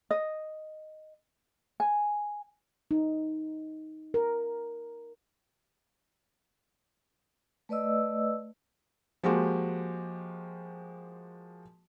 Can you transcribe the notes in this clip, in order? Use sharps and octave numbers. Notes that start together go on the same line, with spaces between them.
D#5
G#5
D#4
A#4
A3 B4 D5 D#5 E6
F3 G#3 A#3 F#4 G4